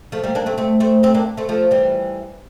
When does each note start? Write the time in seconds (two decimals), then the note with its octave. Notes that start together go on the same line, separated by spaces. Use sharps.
0.12 F3 A3
0.23 G3 A#3
0.35 A#3 D4
0.46 A3 C4
0.58 A3 C4
0.80 A3 C4
1.03 A3 C4
1.14 A#3 D4
1.37 A3 C4
1.49 F3 A3
1.71 E3 G3